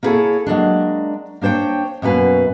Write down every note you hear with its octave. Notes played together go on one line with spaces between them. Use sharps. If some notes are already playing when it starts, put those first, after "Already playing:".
A#3 B3 E4 G#4 A4 C#5
F#3 G#3 A#3 D4
A#3 D4 C5 C#5 G5
F#2 B2 A#3 B4 G#5